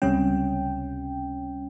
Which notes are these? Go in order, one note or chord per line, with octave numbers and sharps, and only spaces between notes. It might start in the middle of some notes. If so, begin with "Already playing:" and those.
C#2 C3 G3 C#4 G5